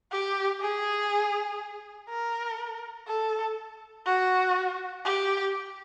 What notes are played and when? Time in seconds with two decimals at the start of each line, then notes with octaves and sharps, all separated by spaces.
0.12 G4
0.61 G#4
2.09 A#4
3.07 A4
4.06 F#4
5.05 G4